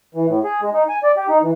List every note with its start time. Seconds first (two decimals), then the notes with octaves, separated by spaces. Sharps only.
0.15 E3
0.27 A2
0.44 G#4
0.62 G#3
0.73 D#4
0.89 G#5
1.03 D5
1.16 G4
1.29 D#4
1.42 E3